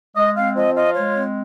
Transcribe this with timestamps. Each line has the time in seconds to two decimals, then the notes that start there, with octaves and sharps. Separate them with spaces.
0.16 G#3 D#5
0.36 C4 F5
0.56 F3 D#5
0.76 F4 D#5
0.96 G#3 C#5
1.15 C4